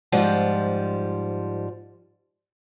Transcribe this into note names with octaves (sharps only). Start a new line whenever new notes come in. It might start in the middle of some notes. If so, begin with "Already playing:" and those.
G#2 F3 G3